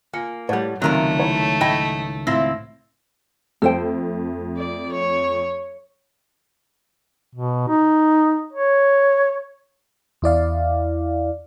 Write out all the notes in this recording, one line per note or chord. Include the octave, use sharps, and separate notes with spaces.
A#3 F4 G#5 C#7
A2 G3 C#5 F#5 G6
C#2 C3 D#3 F#3 A3 C4 A#4
E4 C#5
A2 E4 D#5 G5
A2 C4 E4 F4 E6 A#6
F2 A3 A4 C5 G5
D5
C#5
B2
D#4
C#5
E2 E4 D5 F5